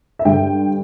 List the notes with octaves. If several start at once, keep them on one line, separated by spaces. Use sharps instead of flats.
E5
G2 D3 G5